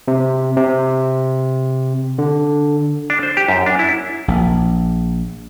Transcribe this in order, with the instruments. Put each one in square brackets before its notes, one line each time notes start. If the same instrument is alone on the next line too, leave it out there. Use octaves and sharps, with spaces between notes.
[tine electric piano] C3
C3
D3
[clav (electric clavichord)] D4
C5
G4
F#2
D4
E4
[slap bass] A#1